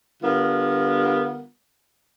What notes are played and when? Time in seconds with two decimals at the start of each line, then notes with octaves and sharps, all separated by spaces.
0.23 D3 G3 B3 F4 A#4